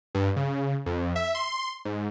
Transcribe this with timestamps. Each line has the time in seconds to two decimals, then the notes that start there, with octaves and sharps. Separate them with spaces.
0.15 G2
0.36 C#3
0.86 F2
1.16 E5
1.35 C6
1.85 G#2